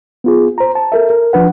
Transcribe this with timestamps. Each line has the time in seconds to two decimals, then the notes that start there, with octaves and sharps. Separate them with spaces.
0.24 B3 F4 G#4
0.58 C5 A#5
0.75 A5
0.92 A4 A#4 E5
1.10 A#4
1.33 F3 D4 B4 F#5